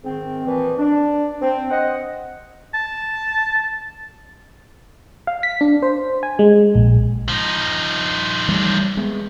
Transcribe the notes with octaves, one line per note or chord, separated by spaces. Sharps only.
G#2 D#3 C4
A#2 E3 F3
D4
C4
C5 D#5 F#5
A5
F5
B6
D4
C5
G#5
G#3
A#1
F3 D#4
E3 G3 A3
G#3 B3